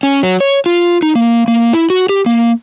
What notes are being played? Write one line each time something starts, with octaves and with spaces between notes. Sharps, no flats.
C#4
F#3
C#5
F4
D#4
A#3
A#3
E4
F#4
G4
A#3